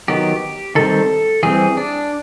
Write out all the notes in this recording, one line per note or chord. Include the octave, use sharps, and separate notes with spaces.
D#3 F#3 B3 G4
D#3 G3 C4 A4
E3 G3 C4 G#4
D4